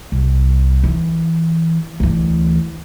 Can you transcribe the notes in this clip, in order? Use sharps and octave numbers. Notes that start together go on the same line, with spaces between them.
C2
E3
D2 E3